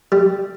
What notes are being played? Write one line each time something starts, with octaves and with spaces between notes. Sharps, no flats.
G3